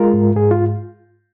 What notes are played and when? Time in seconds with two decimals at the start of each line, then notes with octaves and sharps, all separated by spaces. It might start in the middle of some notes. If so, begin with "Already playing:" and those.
Already playing: G#3 F4 A#4
0.14 G#2
0.36 G#2 G#4
0.51 F4